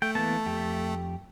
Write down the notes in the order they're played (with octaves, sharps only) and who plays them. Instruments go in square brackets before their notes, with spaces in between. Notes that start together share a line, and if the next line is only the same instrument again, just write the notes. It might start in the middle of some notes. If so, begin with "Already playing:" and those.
[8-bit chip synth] A3 [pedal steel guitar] G5
[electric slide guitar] E3 A#3 B3 [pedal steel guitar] A5
[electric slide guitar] F2 G4